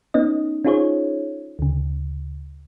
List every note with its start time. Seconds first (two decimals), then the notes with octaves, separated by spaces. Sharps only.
0.14 B3 C#4 D#4 D#5
0.65 C#4 D#4 F4 G#4 C5 C#5
1.59 D2 C#3